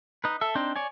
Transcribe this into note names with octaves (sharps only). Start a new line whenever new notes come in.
D#4 B4
A4 E5
C4 D4 D#4 C5
C#5 D5 G#5